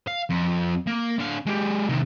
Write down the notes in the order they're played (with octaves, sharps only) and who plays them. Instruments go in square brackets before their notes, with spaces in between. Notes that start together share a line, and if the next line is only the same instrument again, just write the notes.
[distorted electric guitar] F5
F2
A#3
D3 F5
G#3 G4
C3 D#3